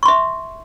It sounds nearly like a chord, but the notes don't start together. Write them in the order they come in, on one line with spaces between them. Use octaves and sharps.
C#6 C6 E5